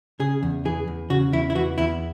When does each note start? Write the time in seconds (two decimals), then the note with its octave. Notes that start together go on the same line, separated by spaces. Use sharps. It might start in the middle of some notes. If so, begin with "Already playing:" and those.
0.20 C#3 G#4
0.43 E2
0.65 E3 G#4
0.88 E2
1.10 C#3 F#4
1.32 E2 E4
1.50 E4
1.55 E3 F#4
1.78 E2 E4